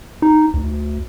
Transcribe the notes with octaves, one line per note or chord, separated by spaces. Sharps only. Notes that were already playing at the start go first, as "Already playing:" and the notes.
D#4
D2